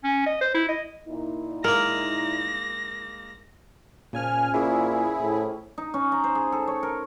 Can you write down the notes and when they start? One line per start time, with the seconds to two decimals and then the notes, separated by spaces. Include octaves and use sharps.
0.04 C#4
0.26 D#5
0.41 C5
0.54 E4
0.69 D#5
1.08 A#2 D#4 E4
1.64 G#3 A#3 A#4 A#6
4.13 A#2 C#3 F3 G#5 F6
4.54 A#2 C#4 E4 G#4 C5 D5
5.22 A2
5.78 D#4
5.94 C#4
6.12 A#5
6.24 C5
6.35 G#4
6.52 A4
6.67 C#5
6.83 A#4